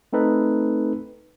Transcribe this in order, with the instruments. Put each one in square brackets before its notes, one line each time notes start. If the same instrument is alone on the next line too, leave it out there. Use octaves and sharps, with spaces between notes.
[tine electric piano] A3 C4 D#4 A4 B4